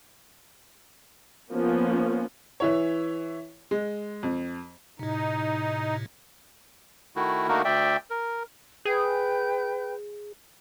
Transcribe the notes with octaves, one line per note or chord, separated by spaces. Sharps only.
F3 A#3 B3 C#4
E3 E4 C#5
G#3
F2
A2 C3 D#4
D#3 A3 E4 F#4
D3 A3 A#3 D#4 F#4 A#4
D2 D5 E5 G5
A#4
G#4 B4 G5 G6